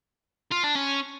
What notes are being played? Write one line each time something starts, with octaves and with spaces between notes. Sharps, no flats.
F4
D4
C#4